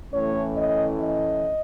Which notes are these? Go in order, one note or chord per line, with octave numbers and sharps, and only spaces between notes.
A2 E3 A3 C#4 C#5
D#5
D#5